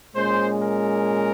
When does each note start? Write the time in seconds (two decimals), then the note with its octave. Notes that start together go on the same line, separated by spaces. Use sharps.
0.15 A#2 G#3 C#4 C5
0.62 A#4